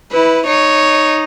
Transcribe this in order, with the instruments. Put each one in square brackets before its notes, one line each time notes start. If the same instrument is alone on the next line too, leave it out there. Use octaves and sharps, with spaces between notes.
[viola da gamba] E4 [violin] B4
[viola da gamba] D#4 [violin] C#5